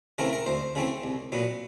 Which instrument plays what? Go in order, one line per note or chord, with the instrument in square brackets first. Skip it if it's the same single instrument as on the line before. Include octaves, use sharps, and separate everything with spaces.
[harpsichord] C#3 E3 A3 C4 A#4
A#4
D2 C5
C#3 E3 A3 C4
C2
A#2 F#3 B3